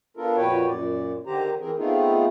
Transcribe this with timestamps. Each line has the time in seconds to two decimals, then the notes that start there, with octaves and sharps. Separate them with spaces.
0.17 B3 D4 F4 A4 A#4
0.37 F2 A#2 F#4 B4 C#5 G5
0.67 F#2 A#2 D5
1.26 D3 D#3 G4 C5 A#5
1.60 E3 C4 G#4 A#4
1.78 A3 B3 C4 D#4 F4 G#4